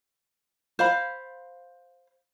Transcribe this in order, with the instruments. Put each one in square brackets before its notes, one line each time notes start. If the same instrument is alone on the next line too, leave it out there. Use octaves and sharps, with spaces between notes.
[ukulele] C5 F5 B5